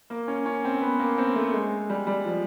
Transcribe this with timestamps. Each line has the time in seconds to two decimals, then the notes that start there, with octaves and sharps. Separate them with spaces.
0.10 A#3
0.28 C#4
0.46 C#4
0.65 C4
0.81 B3
0.99 A#3
1.18 C4
1.36 A3
1.53 G#3
1.90 G3
2.07 G3
2.25 F3